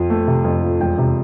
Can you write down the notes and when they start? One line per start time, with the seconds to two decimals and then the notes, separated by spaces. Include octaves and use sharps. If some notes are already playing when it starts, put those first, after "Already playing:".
Already playing: F2 F3
0.10 A3
0.27 C3
0.44 F2
0.63 F3
0.80 E1 G5
0.98 C3